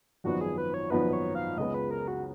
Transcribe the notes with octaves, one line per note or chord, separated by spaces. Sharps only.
G#1 F#2 F3 B3 D#4 F#4
G#4
B4
C#5
G#1 F#2 F3 B3 D#4 B4
C#5
F5
C#2 C#3 G#3 B3 D#5
B4
A#4
F#4